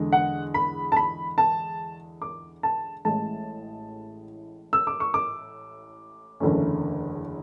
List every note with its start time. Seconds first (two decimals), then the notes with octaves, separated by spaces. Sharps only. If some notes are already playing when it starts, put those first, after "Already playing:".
Already playing: E2 D3 G#3
0.13 F#5
0.54 B5
0.92 A5
0.96 B5
1.38 A5
2.22 D6
2.63 A5
3.05 A1 A2 G#3 A5
4.73 E6
4.87 D6
5.00 C#6
5.14 D6
6.40 F#1 E2 D3 A3 C#4